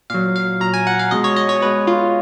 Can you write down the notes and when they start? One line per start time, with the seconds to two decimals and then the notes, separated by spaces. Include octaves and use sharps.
0.10 A#2 F#3 F5
0.36 F5
0.60 A#2 F#3 A#5
0.74 G#5
0.87 F#5
0.99 F5
1.11 B2 G#3 D#5
1.24 C#5
1.36 D#5
1.49 C#5
1.62 B2 G#3 B4
1.87 F4